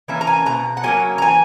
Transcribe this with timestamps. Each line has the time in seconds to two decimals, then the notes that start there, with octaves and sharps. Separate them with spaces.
0.08 E3 A#3 C#4 E5
0.21 A#5
0.27 G#5
0.46 B2 A#5
0.77 F#5
0.83 F#3 A#3 C#4 G#5
1.18 A#5
1.22 E3 G#5